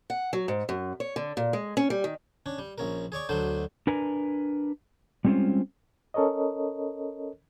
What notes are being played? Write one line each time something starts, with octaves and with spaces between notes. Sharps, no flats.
F#5
F#3
G#2
F#2
C#5
D3
A#2
G#3
C#4
G3
D#3
C#4 D4
G3
A#1 C#4 A#4
G#4 C#5 D5 C#6
D2 F#3 A3 D4 C5
D4 A#4 B4 G#5 A#5
G3 G#3 C4 C#4 F4 C5
C#4 A4 A#4 C#5 D#5